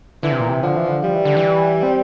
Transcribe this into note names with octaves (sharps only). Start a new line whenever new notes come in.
D3 E3
C3
A#2
C3
D3 F3
E3
D3
F3 G3
E3
D3
E3
C4